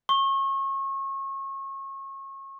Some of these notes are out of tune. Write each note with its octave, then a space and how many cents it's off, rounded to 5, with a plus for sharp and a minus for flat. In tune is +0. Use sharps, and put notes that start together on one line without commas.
C#6 -30